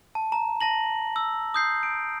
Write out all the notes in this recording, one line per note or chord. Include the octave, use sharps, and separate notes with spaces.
A5
A#5
A5 A#6 F#7
E6
D#6 G6 C7
D7